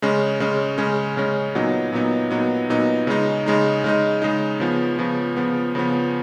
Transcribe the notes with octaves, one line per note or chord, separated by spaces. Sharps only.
C#3 G#3 C#4
C#3 G#3 C#4
C#3 G#3 C#4
C#3 G#3 C#4
A#2 F#3 B3 D#4
A#2 F#3 B3 D#4
A#2 F#3 B3 D#4
A#2 F#3 B3 D#4
C#3 G#3 D#4
C#3 G#3 D#4
C#3 G#3 D#4
C#3 G#3 D#4
C#3 F3 B3
C#3 F3 B3
C#3 F3 B3
C#3 F3 B3